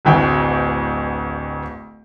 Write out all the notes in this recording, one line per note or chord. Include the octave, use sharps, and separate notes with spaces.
D1 A1 D2 G5 G#5